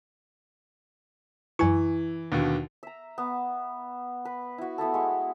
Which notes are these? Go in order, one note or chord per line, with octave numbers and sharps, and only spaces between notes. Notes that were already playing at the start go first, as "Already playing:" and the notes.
F#2 E3 E4 G#5 C#6
D#2 B2 D3
E5 A#5
B3
B4
E4 F#4
A3 B3 E4 A4
G#3 C#6